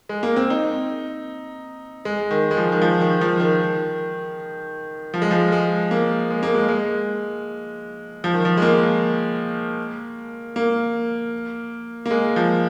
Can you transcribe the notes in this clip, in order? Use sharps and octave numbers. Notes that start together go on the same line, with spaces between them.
G#3
A#3
C4
D#4
G#3
D#3
G#3
F3
D#3
F3
D#3
F3
D#3
F3
G#3
F3
G#3
A#3
G#3
A#3
G#3
G#3
F3
D#3
F3
G#3
A#3
A#3
A#3
G#3
F3